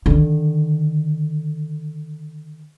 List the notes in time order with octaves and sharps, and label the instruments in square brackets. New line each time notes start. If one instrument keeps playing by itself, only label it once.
[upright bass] D3 D#3